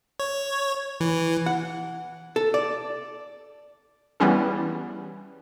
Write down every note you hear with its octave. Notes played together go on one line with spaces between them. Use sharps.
C#5
E3
F#5
A4
D5
E3 G3 B3 C#4 G#4